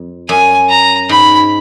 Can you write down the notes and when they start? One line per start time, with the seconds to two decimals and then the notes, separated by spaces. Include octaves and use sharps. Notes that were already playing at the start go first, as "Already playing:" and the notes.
Already playing: F2
0.29 F#2 G#5
0.69 A#5
1.09 G#2 B5